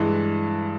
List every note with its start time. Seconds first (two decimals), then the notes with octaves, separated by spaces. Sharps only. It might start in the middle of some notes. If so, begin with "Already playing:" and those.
Already playing: G2 E3 G#3